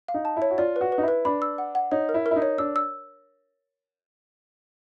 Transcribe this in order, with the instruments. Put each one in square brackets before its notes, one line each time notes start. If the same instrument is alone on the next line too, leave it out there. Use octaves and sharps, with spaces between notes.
[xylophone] F5
[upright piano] D#4
[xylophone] A5
[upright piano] E4
[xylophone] C#5
[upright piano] F#4
[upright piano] F4 [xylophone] D5
[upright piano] F#4 [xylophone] B4
[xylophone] B4
[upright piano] D#4
E4
[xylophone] B4
[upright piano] D4 [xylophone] B5
[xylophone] E6
F#5
F#5
[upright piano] D#4 [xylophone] C#5
[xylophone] A#4
[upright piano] E4
[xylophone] A#4
[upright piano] E4
D#4
[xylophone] C#5
[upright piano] D4 [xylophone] E6
[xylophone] E6